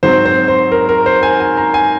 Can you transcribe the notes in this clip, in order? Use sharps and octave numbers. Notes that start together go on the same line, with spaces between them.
G#2 F#3 C4 C5
C5
C5
A#4
A#4
C5
G#5
G#5
A#5
G#5